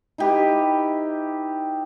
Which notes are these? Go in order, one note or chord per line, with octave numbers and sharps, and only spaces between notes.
D#4 E4 G4 B4